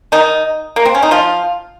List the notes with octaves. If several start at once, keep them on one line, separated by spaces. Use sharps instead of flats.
D#3 D#4
A#3
C4
C#4
D#4
F3 F4